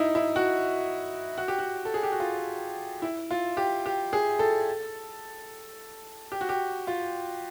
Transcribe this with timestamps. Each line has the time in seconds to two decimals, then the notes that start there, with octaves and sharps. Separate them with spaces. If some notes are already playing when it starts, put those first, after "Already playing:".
Already playing: D#4 E4
0.15 E4
0.36 F#4
1.38 F#4
1.48 G4
1.59 F#4
1.85 A4
1.94 G#4
2.03 G4
2.12 F#4
2.20 F4
3.02 E4
3.31 F4
3.57 G4
3.86 G4
4.13 G#4
4.39 A4
6.32 G4
6.41 F#4
6.49 G4
6.87 F4